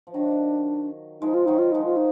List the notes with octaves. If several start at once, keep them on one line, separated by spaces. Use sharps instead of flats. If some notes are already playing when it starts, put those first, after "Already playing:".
F3
D#3 F#3 D4
F3 G#3 D#4
F4
D#3 F#3 D#4
F4
F3 G#3 D#4
F4
D#4